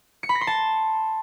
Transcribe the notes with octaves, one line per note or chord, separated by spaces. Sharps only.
C#7
B5
A#6
C6
A5